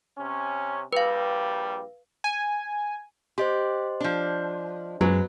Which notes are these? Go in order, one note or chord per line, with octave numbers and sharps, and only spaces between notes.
C3 C#4
A#1 G3 B4 F5
G#5
G4 C5 D#5 C6
F3 D4
F#2 F#3 G#3 B3